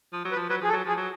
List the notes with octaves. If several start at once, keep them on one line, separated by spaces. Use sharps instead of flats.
F3
F#3
B4
F3
F#3 B4
F3 G#4
A4
F#3
F3 G#4
F#3